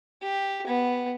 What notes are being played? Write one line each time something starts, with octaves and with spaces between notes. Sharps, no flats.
G4
B3